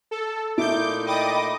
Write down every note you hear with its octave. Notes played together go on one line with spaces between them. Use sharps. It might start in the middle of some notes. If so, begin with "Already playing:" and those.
A4
A#2 A3 D#4 E4 D6 G6
D5 D#5 G5 B5 D6 D#6